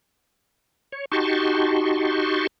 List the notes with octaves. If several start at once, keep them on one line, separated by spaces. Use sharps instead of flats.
C#5
D#4 F#4 G4 A5 C6 C#6